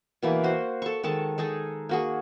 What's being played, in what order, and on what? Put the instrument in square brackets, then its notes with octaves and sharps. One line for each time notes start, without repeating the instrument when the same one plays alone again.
[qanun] B2 E3 A#3
F#4 C5
A4 C#6
D#3 G#3 A4 A5
G#3 D#4 G#4 A4
A#3 F#4 G#4